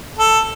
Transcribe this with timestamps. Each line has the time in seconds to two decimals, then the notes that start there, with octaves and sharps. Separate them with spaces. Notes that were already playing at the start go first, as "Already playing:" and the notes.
0.18 A4